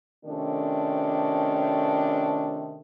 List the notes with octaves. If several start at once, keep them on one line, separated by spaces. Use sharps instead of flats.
C3 D#3 F3 A3 C#4 D4